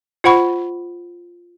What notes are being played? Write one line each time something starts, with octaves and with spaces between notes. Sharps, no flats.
F4 C5 F#5 B5 C#6